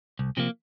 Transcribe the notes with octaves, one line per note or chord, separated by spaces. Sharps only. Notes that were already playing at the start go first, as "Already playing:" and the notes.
C2
C3 F3 A#3